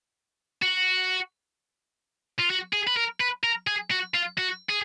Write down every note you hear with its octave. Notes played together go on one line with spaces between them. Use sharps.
F#4
F4
F#4
G#4
B4
A#4
B4
A#4
G#4
F#4
F4
F#4
G#4